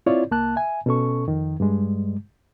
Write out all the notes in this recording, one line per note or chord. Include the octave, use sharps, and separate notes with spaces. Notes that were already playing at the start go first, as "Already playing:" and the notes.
C4 E4 F4 C#5 D5
C2 A#3 A5 F#6
E5 G#5
B2 C#4 A4 C#6
F2 D#3
G2 G3 G#3